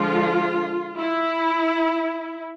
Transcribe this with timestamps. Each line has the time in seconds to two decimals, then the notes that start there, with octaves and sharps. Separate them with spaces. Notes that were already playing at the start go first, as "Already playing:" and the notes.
Already playing: D3 F3 G#3 F4
0.98 E4